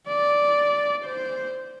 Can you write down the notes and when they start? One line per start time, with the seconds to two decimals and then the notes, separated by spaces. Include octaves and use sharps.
0.08 D5
1.05 C5